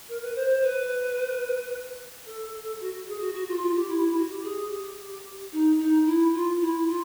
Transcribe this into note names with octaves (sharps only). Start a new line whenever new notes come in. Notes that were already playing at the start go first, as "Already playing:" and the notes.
A#4
B4
C5
C5
B4
A4
A4
F#4
G#4
F#4
F#4
F4
F4
G4
E4
E4
F#4
G4
G#4
G4
D#4
D#4
E4
F4
E4
F4